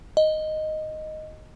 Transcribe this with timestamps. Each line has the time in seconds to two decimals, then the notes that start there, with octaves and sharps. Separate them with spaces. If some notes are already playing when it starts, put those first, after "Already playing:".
0.17 D#5